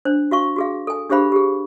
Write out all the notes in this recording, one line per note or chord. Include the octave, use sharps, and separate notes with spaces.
D4 C5
F#4 F5 C#6
F#4 G#4 F5
A4 G#5
D4 G4 G#4 C5 F5 B5
G4 G#4